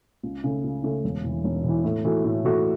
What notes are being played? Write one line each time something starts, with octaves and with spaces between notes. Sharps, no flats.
C#2
C#3 A3
C#2
C#3 A3
E1
E2 E3
E1
E2 E3
A2
E3 A3 F#4
A2
E3 A3 F#4